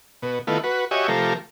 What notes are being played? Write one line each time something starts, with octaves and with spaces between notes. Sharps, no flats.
B2
D#3 A3 B3 E4 F4
F#4 B4
F#4 G4 C#5 D#5 E5 G#5
C3 F3 A3 G4 A#4